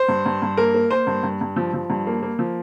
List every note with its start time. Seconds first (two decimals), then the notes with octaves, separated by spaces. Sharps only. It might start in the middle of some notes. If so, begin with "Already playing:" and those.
Already playing: C5
0.08 G2
0.26 G2
0.42 G2
0.57 A#3 A#4
0.74 A#3
0.91 A#3 C5
1.07 G2
1.23 G2
1.41 G2
1.56 F3
1.73 F3
1.90 G2
2.07 A#3
2.23 A#3
2.39 F3